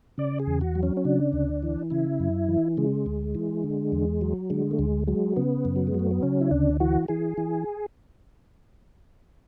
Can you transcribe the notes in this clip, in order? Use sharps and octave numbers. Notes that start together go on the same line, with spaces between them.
C#3 D5
G#4
E2
F#4
F#3
C#4
C#4
C#3 D4
D2
E3
C#3 E4
F#2
E3
C#3 G#3
D2
E3
D3
E2
F#3
D3 G#3
A3
D2 G#3
F#3 G#3
C#3 B3
F#2
F#3
G#3
F#3 A3
B3
C#3 C#4
E4
D2 D4
E3 F#4
E3 G#4
E3